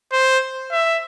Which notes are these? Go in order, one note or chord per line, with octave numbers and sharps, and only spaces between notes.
C5
E5